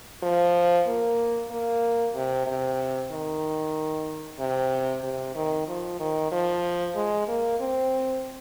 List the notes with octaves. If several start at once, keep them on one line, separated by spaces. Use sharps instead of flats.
F3
A#3
A#3
C3
C3
D#3
C3
C3
D#3
F3
D#3
F3
G#3
A#3
C4